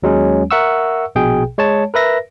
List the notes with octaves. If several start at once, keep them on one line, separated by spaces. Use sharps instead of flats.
D#2 F#3 G#3 C#4
A#4 E5 F#5 C#6 E6
A#1 B2 G#4 G5
G#3 C#5 A5
A#4 B4 E5 A#6